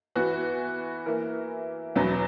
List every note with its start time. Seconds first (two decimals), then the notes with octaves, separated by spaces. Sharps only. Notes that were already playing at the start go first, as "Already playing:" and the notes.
0.16 E3 B3 F#4
1.05 E3 A#3 E4 A#4
1.96 E2 B2 F#3 B3